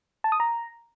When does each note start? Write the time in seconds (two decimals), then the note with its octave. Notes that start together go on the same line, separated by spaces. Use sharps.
0.24 A5
0.32 D#6
0.40 A#5